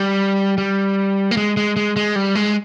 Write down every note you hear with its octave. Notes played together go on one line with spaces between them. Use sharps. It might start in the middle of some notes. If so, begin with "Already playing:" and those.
Already playing: G3
G3
A#3
G#3
G#3
G#3
G#3
G3
G#3